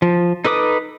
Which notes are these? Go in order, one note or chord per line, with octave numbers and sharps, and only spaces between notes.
F3
D#4 A4 B4 D6 D#6